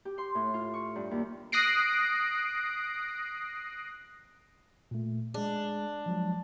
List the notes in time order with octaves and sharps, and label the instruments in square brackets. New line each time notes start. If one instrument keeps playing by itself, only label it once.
[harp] G4
C6
A2
F4
C#6
G2
D#2
[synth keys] D#6 F#6 A#6 C7 D7
[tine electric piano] A#2 A3
[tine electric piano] G#3 G#4 [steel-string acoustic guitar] D4
[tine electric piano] F3 F#3 G#3